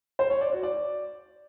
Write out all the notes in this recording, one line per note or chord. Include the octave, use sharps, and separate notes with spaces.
C5
C#5
D5
F#4
D5